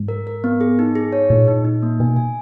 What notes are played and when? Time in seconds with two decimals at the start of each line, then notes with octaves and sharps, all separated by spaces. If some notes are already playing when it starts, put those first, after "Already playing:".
Already playing: G#2
0.08 A#4
0.27 A#4
0.44 B3
0.61 G#4
0.79 D#4
0.95 G#4
1.13 C#5
1.30 A#2 D#4
1.48 D#4
1.64 D#4
1.83 A#3
2.00 B2 G#5
2.16 G#5